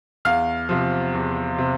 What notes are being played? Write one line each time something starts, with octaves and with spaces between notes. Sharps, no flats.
E2 F5 F6
C3 F3
E2
C3